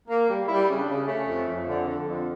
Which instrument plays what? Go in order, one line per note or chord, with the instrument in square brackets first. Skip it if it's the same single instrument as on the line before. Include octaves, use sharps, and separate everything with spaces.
[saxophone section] A#3
G3
G3 E4
C#3
D4
C#3
A3 C#4
F2
F2
D3
D3
F2